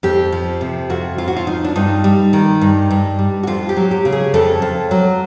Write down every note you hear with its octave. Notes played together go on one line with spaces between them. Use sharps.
F2 G4
F3
C3
F2 F#4
F2 F4
F#4
F4
F3 D#4
D4
G2 D#4
G3
D#3
G2
G2
G3
F#4
F2 F4
G4
F#3
G4
C#3
G#4
F2 A4
F2
F#3